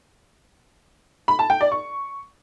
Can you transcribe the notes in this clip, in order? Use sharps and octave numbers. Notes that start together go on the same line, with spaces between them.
B5
A5
G5
D5
C#6